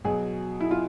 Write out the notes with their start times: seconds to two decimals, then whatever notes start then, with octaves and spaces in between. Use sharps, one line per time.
0.04 B2 F#3 G#4
0.60 E4
0.71 F4